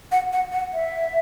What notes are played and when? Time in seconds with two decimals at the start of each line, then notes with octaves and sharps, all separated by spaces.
0.12 F#5
0.33 F#5
0.53 F#5
0.74 E5